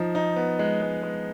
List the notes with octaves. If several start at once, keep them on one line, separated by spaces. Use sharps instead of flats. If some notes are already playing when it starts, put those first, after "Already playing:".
Already playing: F3 D#4
D#4
B3
G#3
G#3
G#3